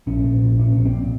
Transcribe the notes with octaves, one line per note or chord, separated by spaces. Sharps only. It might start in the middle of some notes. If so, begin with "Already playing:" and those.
A#1 C#4
A#2
A#1
A#2 C#4
A#1 C#4
C4
A#2